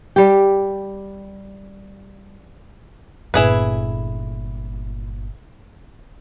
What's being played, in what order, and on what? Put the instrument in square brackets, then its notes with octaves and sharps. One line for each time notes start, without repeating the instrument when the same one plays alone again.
[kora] G3 G4
[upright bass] G1 A#2 [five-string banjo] E4 G#4 B4